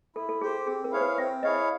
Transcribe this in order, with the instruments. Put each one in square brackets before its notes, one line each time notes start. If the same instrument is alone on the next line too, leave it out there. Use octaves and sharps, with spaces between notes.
[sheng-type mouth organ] E4 [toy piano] A4
[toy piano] A4
[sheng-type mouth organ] G4 C5 [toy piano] G#4
[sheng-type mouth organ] C4 [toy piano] G#4
[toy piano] A#4
[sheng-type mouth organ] E4 G#4 C#5 F5 [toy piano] C5
[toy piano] B4
[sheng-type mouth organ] C4 [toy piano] E5
[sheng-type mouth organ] E4 G#4 C#5 F5 [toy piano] D#5